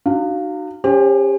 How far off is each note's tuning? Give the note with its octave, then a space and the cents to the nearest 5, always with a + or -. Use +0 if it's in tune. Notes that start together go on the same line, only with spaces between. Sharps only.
D#4 -40 F#4 +10 F5 +0
C#4 +0 G4 +30 C5 +30